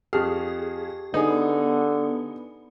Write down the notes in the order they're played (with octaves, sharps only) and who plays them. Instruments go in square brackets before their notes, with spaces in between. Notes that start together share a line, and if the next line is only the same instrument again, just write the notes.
[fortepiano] F2 F6 [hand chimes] G4 [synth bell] G#4
[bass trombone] D3 [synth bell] B3 [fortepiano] D#4 G#4